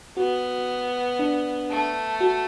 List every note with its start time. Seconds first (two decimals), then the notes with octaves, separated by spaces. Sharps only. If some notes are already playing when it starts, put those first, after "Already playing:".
0.17 B3 F#4
1.19 D4
1.70 A3
2.20 F#4